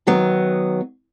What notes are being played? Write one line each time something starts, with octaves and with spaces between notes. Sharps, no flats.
D#3 F#3 B3